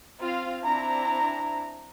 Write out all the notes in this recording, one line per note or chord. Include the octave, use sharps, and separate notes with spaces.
C4 F4 F5
C4 D4 E4 A#5